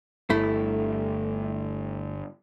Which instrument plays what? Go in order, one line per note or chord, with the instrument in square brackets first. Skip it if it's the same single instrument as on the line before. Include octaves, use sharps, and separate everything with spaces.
[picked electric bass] G1 [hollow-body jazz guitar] A3 E4